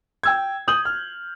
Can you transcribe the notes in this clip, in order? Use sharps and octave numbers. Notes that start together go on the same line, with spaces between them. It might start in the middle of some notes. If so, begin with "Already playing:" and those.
G5 E6 G#6
D#6 G6 F#7
F6